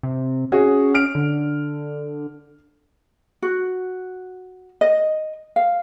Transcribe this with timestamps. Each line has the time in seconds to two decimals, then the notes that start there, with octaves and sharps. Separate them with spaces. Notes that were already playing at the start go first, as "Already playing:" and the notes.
0.03 C3
0.52 C#4 F#4 G#4
0.94 F6 D7
1.15 D3
3.42 F#4
4.81 D#5
5.56 F5